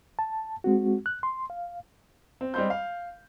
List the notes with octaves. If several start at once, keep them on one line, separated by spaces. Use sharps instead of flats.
A5
G#3 C4 F#4
F#6
C6
F5
C4
G3 G#3 C4 C6 G6
F5